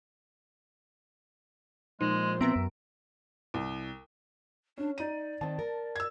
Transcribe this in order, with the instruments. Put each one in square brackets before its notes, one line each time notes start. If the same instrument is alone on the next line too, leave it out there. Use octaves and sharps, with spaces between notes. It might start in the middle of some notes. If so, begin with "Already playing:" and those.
[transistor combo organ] A#2 F3 C5 [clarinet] G#3 [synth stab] D#4
[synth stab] B3 A#5 D7 [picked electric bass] C4 [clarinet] E5
[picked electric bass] F#2
[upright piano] C2
[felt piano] C#4 [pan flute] D4
[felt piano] D#4 D#7 [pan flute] D5
[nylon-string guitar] D#3 C4 [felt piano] A5
[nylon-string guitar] A#4
[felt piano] E6 G#6